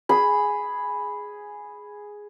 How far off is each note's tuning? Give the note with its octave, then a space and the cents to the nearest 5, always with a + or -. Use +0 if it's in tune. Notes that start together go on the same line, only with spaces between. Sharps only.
G#4 +0 B5 +0